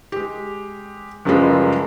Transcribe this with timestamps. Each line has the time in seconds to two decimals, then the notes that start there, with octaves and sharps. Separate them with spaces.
0.12 G#3 G4
1.25 F#1 F#2 F3 G3 G#3 B4